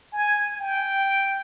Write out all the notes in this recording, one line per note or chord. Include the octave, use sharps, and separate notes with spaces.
G#5
G5